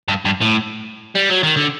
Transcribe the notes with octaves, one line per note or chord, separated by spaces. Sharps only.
G2
G2
A2
G3
F#3
D#3
D3